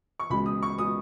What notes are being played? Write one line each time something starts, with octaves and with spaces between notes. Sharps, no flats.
C#6
C#2 B2 G#3 B5
D#6
C#6
B2 G#3 D#6